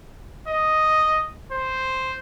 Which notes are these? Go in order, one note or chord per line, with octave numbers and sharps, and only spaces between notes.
D#5
C5